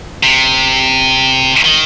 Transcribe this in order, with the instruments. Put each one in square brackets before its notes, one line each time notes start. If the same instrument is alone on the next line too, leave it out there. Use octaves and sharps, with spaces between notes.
[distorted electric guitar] C3
D#3